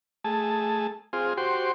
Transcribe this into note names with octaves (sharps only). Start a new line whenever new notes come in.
A3 G#4 A5
C4 F4 G#4
F#4 G4 C5 C6